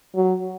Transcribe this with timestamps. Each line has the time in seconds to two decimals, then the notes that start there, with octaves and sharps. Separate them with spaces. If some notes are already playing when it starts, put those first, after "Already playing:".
0.15 F#3